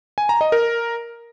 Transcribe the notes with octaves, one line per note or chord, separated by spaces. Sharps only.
G#5
A#5
D#5
A#4